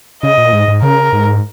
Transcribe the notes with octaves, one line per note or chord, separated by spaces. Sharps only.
C#3 D#5
A#2
G#2
G#2
C#3 A#4
G#2